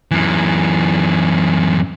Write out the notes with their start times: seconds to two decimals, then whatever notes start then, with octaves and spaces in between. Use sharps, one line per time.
0.11 F#2 E3